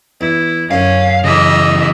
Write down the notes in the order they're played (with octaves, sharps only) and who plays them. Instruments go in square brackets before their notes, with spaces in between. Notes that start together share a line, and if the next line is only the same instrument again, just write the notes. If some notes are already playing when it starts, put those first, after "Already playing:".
[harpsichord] E2 [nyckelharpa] E4
[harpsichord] F#2 D3 [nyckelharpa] C#4 [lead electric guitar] F5
[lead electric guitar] C#3 E3 [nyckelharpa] D#5 E5